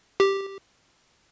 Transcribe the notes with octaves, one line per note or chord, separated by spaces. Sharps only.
G4